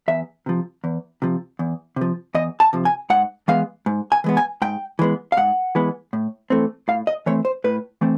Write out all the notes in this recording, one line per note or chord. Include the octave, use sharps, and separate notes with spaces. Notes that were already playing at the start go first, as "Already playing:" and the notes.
E2 E5
C3 F3
E2
C3 F3
E2
C3 F3
E2 D#5
A5
C3 F3
G#5
G#2 F#5
E3 G#3 B3 F5
G#2
G#5
E3 G#3 B3
G#5
G#2 G5
E3 G#3 B3
F5
G#2 F#5
E3 G#3 B3
A2
E3 A3 C4
A2 F5
D#5
E3 A3 C4 C#5
C5
A2 B4
E3 A3 C4